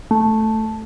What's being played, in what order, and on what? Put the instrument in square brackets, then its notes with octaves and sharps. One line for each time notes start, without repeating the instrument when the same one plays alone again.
[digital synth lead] A3